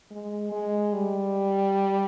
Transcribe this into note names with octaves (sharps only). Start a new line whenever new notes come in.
G#3
G#3
G3